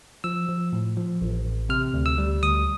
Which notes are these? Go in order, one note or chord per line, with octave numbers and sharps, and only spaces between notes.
F3 E6
F3
A2
F3
A1
A1
C3 F6
D2
E6
G3
D2 D#6